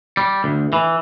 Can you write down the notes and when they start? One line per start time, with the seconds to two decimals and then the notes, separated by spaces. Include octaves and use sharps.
0.17 G3
0.44 D2
0.73 E3